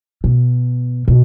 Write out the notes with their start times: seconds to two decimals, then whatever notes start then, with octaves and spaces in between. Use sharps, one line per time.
0.24 B2
1.08 B2